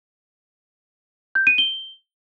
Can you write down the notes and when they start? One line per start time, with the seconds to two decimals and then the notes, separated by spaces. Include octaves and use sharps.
1.35 G6
1.47 D#7
1.58 G7